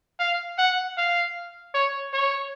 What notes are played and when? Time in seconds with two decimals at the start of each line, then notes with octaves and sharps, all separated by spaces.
0.19 F5
0.58 F#5
0.97 F5
1.74 C#5
2.13 C#5